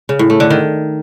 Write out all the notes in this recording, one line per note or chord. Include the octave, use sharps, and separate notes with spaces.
C#3
A2
A3
D3
D#3